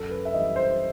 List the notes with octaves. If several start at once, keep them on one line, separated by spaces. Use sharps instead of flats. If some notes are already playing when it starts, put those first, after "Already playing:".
Already playing: F#2 A4
B4
E5
E3 G3 D#5
C5